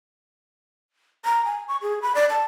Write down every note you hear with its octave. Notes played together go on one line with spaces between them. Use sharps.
A#5
G#5
C#6
G#4
B5
D5
A5